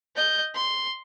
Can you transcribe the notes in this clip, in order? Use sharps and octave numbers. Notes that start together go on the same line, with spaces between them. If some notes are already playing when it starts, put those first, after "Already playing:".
D#5 G6
C6